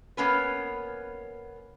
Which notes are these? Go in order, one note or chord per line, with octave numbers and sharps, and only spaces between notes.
A#3 B3 C#4 B4